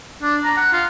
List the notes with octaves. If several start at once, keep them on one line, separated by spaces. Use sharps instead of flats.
D4
A#5
F#5
F4